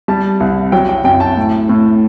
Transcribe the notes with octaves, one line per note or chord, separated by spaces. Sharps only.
G3 A5
C2
F#3 G5
G5
F#2 G5
A5
A2
A2